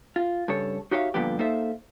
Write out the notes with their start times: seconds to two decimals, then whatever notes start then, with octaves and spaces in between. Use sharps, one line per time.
0.16 F4
0.48 G2 C#3 A4 C#5
0.91 D#4 F#4 G4 C#5 E5 F5
1.14 G2 A#2 D3 F3 B3 G4
1.39 A#3 D#4 A4 C5 E5